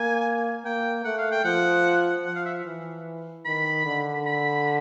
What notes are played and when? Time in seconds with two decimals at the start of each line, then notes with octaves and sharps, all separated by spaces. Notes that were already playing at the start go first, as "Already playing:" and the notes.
Already playing: A#3 G#5
0.65 A#3 G5
1.05 A3 F#5
1.18 F5
1.32 G5
1.45 F3 F#5
2.25 F3 F#5
2.36 F5
2.46 E5
2.65 E3
3.46 D#3 B5
3.85 D3
4.26 B5